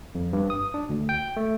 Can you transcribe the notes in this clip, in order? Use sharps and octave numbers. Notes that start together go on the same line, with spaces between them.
F2
G2
D#6
D4
D2
G5
A3